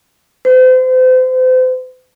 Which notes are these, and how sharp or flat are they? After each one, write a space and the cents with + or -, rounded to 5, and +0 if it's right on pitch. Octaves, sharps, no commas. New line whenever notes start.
C5 -35